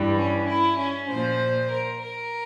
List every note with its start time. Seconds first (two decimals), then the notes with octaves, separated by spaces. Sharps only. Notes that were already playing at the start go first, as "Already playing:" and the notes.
Already playing: G2 E3 G3
0.17 C#4
0.48 E4
0.78 C#4
1.09 A#2 F3 C5
1.71 A#4
2.02 A#4